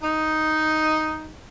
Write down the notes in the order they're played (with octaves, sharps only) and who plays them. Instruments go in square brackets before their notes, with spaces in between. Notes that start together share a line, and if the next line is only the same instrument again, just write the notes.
[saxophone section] D#4